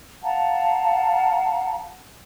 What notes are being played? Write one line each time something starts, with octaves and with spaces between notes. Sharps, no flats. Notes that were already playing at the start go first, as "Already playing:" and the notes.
F5 F#5 A5 A#5